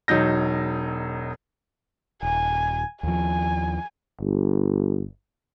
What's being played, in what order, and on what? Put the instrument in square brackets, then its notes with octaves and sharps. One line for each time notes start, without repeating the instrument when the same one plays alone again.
[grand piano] E1 F#3 D#4 G6 A#6
[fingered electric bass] D#1 [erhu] G#5
[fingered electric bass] D#2 F3 [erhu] G#5
[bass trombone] G1